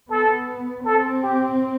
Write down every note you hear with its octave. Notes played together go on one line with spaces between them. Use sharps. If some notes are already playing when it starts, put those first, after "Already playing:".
B3 A4
C4 A4
G4